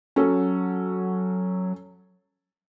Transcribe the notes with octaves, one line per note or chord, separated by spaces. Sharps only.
F#3 C#4 A4